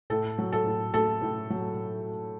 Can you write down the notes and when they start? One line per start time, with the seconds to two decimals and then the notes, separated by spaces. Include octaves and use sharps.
0.10 A2 A4
0.38 F#3
0.52 A4
0.66 A2
0.93 A3 A4
1.22 A2
1.50 F#3